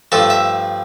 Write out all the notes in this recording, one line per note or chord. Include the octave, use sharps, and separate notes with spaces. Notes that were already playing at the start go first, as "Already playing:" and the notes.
G2 F3 A3 A4
E5